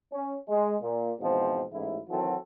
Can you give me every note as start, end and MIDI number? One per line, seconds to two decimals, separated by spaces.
0.13 0.37 61
0.48 0.76 56
0.82 1.12 46
1.20 1.64 40
1.20 1.64 44
1.20 1.64 47
1.20 1.64 53
1.20 1.64 60
1.73 1.99 33
1.73 1.99 44
1.73 1.99 64
2.10 2.35 51
2.10 2.35 52
2.10 2.35 54
2.10 2.35 60
2.10 2.35 66
2.10 2.35 69